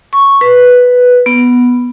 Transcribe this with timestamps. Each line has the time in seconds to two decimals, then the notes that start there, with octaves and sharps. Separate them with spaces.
0.13 C#6
0.41 B4
1.26 B3